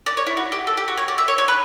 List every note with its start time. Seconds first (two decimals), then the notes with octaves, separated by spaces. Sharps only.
0.06 D5
0.17 C#5
0.27 E4
0.37 F#4
0.52 G4
0.67 A4
0.77 G4
0.88 F#4
0.98 C#5
1.08 D5
1.18 E5
1.28 C#5
1.38 C#5
1.48 B4